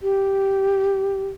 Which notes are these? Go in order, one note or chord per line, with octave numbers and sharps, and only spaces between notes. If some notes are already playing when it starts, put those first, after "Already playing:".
G4